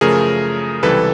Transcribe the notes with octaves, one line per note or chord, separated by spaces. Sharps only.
F#2 C#3 F3 A3 G#4 A#4
C#2 C3 E3 G3 A4 B4